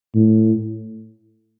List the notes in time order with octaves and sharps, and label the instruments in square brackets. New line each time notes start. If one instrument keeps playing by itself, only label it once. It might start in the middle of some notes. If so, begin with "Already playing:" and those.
[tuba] A2